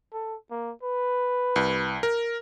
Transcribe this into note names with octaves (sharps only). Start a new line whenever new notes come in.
A4
A#3
B4
C2
A#4